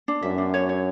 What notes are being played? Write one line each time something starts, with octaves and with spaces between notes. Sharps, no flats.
D4
F#2 E5
D4
C#5
C#5